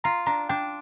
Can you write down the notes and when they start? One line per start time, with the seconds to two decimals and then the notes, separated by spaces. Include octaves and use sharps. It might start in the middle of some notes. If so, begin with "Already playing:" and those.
0.04 F4 A#5
0.26 D4 A#5
0.49 D4 G5